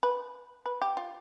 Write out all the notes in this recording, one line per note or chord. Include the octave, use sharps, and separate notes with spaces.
B4
B4
G4
F4